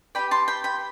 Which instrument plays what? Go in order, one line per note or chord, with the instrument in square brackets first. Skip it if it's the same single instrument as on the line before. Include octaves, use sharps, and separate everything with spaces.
[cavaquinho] G4 B4 D5 G5 B5
A5 C6
G5 B5
G5 B5